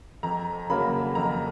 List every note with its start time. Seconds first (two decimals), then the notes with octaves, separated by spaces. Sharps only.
0.23 F2 A#5
0.69 C#3 F#3 A#3 B5
1.15 F2 A#5